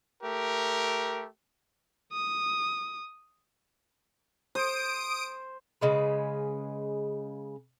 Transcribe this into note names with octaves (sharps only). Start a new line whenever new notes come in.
A3 G4 A#4
D#6
C5 D#6 D7
C#3 G#3 B4